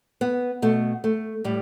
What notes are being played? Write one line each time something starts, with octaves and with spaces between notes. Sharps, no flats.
B3
B2 A3
A3
A2 G3